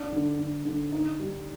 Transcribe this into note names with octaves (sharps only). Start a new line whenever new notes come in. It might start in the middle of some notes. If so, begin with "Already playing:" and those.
Already playing: D4
D3
D3
D3
D#4
G3